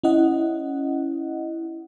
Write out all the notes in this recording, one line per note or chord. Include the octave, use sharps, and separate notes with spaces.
C#4 E4 D#5 F#5